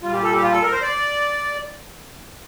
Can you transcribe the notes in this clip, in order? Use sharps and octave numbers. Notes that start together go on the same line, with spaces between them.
A#2 G3 F4
G4
A4
G4
F4
A4
A#4
C5
D5